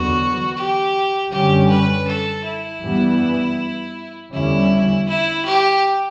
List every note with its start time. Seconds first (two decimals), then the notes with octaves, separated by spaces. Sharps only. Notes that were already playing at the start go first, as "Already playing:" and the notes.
Already playing: E2 D3 F#3 B3 F#4
0.57 G4
1.31 F#2 D3 G3 C#4 G4
1.69 B4
2.07 A4
2.44 E4
2.82 G2 E3 G3 B3
4.32 E2 D3 G3 C#4 E4
5.08 E4
5.45 G4